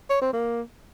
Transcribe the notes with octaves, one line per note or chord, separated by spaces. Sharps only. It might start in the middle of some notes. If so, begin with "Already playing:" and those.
C#5
C4
A#3